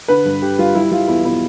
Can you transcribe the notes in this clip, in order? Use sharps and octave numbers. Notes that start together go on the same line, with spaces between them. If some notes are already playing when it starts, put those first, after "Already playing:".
D3 B4
G2
D3 G4
G3 F4
G3 E4
G3 F4
E2 E4
B2 E4